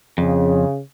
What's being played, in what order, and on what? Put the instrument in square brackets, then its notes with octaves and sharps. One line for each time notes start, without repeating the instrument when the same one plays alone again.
[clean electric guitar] F2 [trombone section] C#3